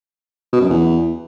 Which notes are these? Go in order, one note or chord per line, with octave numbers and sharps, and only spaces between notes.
B2
F#2
E2